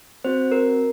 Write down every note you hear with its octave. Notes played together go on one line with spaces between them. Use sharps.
C4 F#4 C5
A#4